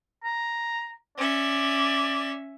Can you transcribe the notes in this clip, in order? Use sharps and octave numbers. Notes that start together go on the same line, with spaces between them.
A#5
C#4 D5 E5